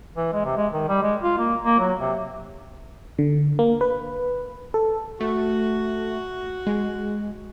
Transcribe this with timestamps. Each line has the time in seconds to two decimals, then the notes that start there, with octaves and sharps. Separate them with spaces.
0.16 E3
0.33 G#3
0.45 C3
0.57 G#3
0.73 D#3
0.88 G3
1.02 G#3
1.23 F4
1.38 A#3
1.64 A#3
1.79 F#3
2.00 C3
3.19 D3
3.59 A#3
3.81 B4
4.74 A4
5.21 A3 F#4
6.67 G#3